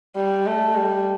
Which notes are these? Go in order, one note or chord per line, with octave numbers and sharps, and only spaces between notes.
G3
A3
G3